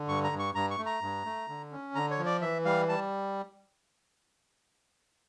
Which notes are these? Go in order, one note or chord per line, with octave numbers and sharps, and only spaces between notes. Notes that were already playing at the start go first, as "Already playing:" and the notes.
Already playing: D3
G2 C#6
A#5
G2
C#6
G2 A#5
C#6
A3
A#5
G2
A3
D3
C#4
D3 A#5
C#5
F3
D5
E3 E5
G3 F5
G3 A5